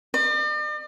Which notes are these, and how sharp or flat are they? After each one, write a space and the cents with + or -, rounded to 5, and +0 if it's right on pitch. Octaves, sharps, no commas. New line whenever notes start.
D5 +45